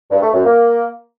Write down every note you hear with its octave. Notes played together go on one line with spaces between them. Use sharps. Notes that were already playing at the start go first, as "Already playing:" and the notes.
G2
A3
F#2
A#3